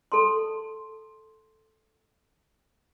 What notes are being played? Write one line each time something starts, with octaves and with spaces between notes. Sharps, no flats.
A4 A5 C6